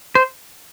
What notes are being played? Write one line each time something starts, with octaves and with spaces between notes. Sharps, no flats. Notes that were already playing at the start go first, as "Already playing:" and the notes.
C5